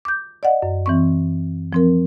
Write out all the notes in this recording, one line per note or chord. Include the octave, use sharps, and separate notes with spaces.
D6 G6
D5 D#5 F#5
F#2
E3 C4 C#6
F3 C4 A#4